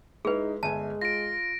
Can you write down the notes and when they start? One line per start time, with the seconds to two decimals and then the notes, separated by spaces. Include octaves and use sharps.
0.25 G#3 D#4 E4 G#4 B4
0.63 G1 G#3 E5 G#5 A5
1.01 F4 A#6 D7